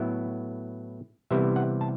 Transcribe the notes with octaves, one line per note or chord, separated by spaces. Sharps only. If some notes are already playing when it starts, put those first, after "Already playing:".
Already playing: A2 F#3 B3 E4 E5
C3 E3 G3 B3 E4 E5
F#5
A5